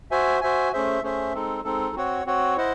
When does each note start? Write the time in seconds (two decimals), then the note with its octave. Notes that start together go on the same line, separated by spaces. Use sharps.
0.11 F#4 C5 E5 G#5
0.41 F#4 C5 E5 G#5
0.73 A3 C#4 G#4 C5 E5
1.02 A3 C#4 G#4 C5 E5
1.33 G#3 C4 D#4 A4
1.64 G#3 C4 D#4 A4
1.96 C4 F#4 C#5 F#5
2.26 C4 F#4 C#5 F#5
2.57 E4 C5 D#5 F#5